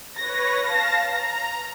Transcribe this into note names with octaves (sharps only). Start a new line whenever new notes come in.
B4 C#5 A#6
F5 A5
A#5